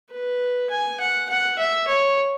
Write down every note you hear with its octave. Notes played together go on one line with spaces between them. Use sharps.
B4
G#5
F#5
F#5
E5
C#5